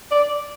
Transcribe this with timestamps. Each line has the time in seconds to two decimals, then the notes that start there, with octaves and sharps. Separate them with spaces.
0.11 D5